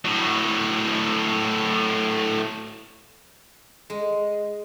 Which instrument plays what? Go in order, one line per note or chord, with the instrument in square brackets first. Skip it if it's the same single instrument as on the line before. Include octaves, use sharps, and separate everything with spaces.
[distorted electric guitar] A2 F#3
[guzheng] G#3